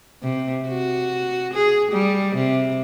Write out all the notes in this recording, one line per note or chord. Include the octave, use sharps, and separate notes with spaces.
C3
F#4
G#4
G3
C3